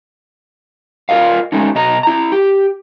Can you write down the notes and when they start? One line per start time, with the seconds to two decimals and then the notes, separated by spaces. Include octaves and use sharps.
1.09 F4 A#4 D#5 F5
1.52 G#3 A3 C#4 D#4
1.75 B2 D#5 A#5
2.03 E4 A#5
2.32 G4